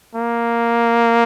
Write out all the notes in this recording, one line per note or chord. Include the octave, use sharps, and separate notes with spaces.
A#3